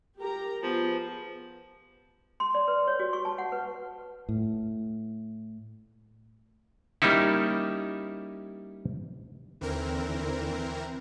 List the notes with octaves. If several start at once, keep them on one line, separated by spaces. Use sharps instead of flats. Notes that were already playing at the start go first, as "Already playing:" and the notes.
G4 A#4 A#5
F3 B3 G#4
C6
D5
B4
C#5
F#4
C#6
A5
F#5
B4
A2
G3 A#3 C#4 D#4 E4
D#2 D3 E3 C4 A#4